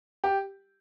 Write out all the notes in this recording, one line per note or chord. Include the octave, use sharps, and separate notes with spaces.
G4